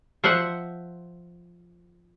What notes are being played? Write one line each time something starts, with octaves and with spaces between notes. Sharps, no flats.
F3 C5 E5 F#5